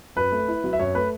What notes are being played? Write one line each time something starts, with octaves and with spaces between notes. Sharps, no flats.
F#2 B4
A3
E4
F#3
E5
F#2 C#5
A3 B4